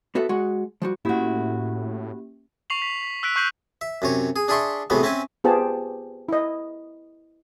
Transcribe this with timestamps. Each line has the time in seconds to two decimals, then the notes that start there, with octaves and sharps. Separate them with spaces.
0.15 B3 F#4 A4 E5
0.29 G#3 F#4 F#5
0.82 F3 G3 F#4
1.05 A2 A#3 C#4 E4 F#4 G4
2.70 C#6 C7 F7 F#7
2.82 B6
3.03 B6
3.23 E6 F#6 B6 D7
3.36 C#6 F#6 G6 C7 F#7
3.81 E5
4.02 F#2 C3 C#5
4.36 G#4
4.48 D4 G#4 D5 E5 C6 C#6
4.90 A2 C3 F#3 G#3 B3
5.03 C4 C#4 E5 G#5
5.44 B3 F4 G4 G#4 C5 A5
6.29 E4 D#5